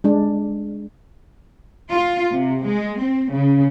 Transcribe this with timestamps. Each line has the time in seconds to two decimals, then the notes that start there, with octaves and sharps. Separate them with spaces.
0.04 G#3 D4
1.90 F4
2.34 C3
2.67 G#3
3.01 C4
3.33 C#3